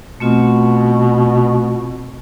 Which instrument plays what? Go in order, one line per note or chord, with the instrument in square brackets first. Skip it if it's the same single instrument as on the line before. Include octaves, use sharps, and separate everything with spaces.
[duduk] B2 [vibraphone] A3 C4 F4